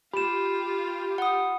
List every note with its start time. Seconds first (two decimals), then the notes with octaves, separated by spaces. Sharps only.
0.13 F4 G4 B5 E7
1.18 F#5 D#6